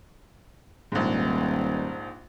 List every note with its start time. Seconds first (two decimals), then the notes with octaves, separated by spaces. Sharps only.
0.92 D#1 A#1 G#2